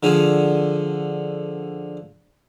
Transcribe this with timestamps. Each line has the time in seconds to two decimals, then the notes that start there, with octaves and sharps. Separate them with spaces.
0.03 D3 F3 G#4